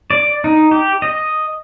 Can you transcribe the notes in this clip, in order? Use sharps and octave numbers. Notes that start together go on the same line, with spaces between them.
D5
D#4
G4
D#5